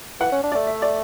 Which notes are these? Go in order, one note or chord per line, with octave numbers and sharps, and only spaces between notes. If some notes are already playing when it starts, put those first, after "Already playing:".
E3 F#5
C#4
D4
A3 D5
E5
D5